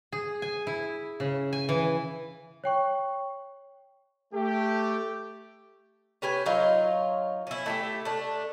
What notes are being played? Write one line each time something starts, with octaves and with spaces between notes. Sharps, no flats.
G#4
G#5
E4
C#3
G#5
E3
C#5 G5 C#6
A3 G4
C#4 G4 B4 G#5
F#3 D#4 F4 C#5
C#4 E4
A3 E4 G4
A3 D4